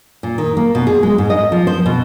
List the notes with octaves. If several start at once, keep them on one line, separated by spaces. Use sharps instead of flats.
A#2
D#3
A#3
B2
G#4
G#3
G#2
D#5
F3
C5
B2